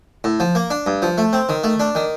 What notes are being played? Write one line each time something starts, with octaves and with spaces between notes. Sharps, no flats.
A2
F3
A#3
D4
G2
F3
A3
C4
D#3
A3
D4
D#3